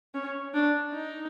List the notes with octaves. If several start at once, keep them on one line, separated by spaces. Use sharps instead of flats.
C#4
D4
D#4